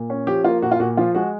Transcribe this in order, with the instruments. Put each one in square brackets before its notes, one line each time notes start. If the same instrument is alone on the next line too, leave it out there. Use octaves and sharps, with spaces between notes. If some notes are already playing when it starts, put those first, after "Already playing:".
Already playing: [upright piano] A#2
C#4
F3 G4
A#3 F4
A#2 F#4
F4
A#2 F#4
F3 F4
G#3 F#4